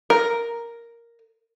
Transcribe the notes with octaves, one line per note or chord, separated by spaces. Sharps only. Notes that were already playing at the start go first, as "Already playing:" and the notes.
A#4